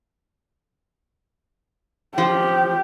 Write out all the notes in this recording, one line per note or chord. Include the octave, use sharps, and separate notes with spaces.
F3 G4